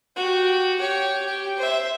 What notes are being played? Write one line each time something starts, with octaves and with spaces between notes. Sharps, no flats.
F#4 G4
G4 C#5
G4
C5 E5